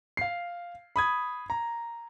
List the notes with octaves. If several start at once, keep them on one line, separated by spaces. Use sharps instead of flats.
F5 C7
B5 D#6 G#6
A#5